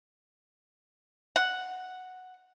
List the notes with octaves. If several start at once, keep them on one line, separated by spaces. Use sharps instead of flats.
F#5